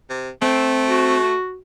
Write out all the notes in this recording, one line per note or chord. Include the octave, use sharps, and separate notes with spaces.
C3
A3 C4
F#4